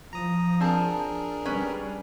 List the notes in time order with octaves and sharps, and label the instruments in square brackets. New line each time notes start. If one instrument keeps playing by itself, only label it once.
[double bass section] F3 [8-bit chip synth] A#5 D#6
[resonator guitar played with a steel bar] C4 A5 [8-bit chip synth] D4 G#4 A#4
[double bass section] G3 [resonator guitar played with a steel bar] C#4 B4